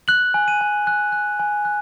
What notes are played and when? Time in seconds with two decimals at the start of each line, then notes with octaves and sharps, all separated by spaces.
0.08 F#6 F#7
0.34 G#5
0.48 D#7
0.61 G#5
0.87 F#6
1.12 F#6
1.40 G#5
1.65 F#6